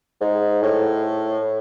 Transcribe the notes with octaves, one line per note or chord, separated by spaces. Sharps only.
G#2
A2